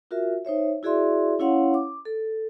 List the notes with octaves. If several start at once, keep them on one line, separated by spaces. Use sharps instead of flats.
F4 F#4 A#4 E5
D#4 C5 C#5 E5
E4 F#4 G#4 D5 E5 C6
C#4 E4 C#5 F5 F#5 C6
D6
A4